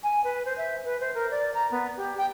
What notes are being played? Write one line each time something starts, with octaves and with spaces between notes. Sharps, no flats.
G#5
B4
C5
E5
B4
C5
A#4
D5
A#5
B3
G4
G5